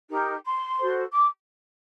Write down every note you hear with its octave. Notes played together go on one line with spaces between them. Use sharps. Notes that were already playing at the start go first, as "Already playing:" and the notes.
D#4 G4 A#4
C6
F#4 A4 C5
D6